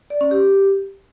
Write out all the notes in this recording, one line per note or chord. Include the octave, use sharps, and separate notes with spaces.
D5
C#4
G4